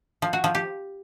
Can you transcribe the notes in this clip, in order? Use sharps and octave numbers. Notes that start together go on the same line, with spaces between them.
F3
F#4
F3
G4